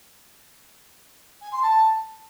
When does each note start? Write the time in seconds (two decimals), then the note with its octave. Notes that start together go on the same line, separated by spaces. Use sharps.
1.41 G#5
1.52 C6
1.62 A5